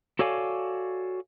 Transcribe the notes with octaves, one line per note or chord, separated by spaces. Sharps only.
F#4 A4 C#5 D5 F5 G#5